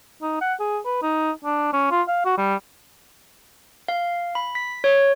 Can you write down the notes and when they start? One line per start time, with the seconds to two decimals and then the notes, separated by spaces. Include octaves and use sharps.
0.22 D#4
0.41 F#5
0.60 G#4
0.86 B4
1.02 D#4
1.45 D4
1.73 C#4
1.91 F4
2.08 F5
2.25 F#4
2.38 G3
3.88 F5
4.35 B5
4.55 B6
4.84 C#5